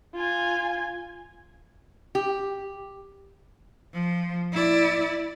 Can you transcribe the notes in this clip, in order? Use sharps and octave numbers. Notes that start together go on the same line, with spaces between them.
F4 G#5
G4
F3
E4 D5